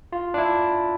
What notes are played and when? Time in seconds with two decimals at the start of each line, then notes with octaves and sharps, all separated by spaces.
0.12 F4
0.34 D4
0.38 E4